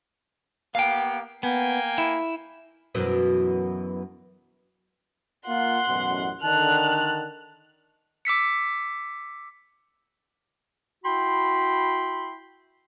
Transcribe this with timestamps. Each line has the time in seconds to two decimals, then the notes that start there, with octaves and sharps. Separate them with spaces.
0.75 A#3 B3 G4 F5 G5
1.43 A#3 B3 G5 G#5
1.98 E4
2.95 F#2 B2 E3
5.47 A#3 F4 F#5 C6
5.87 A1 F#2 B2
6.42 D3 D#3 A5 F6 F#6
8.25 D6 E6 B6 C#7
11.04 E4 F#4 G5 B5 C6